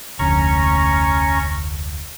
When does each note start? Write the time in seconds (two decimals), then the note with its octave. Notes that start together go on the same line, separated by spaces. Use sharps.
0.19 F1 D2 C#4 A#5 C#6